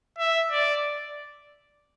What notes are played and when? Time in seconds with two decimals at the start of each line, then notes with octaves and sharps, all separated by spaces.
0.19 E5
0.51 D5